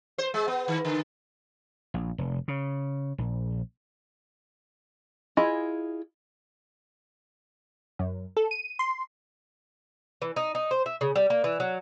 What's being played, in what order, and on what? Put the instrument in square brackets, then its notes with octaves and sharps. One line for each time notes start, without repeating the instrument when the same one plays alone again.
[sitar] C5
G#3
B3
D#3
D3
[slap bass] A#1
F1
C#3
A#1
[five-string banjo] E4 F4 G#4 D#5
[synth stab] F#2
A4
D#7
C6
[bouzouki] E3
D#4
D#4
C5
E5
C#3
G3
A#3
E3
F#3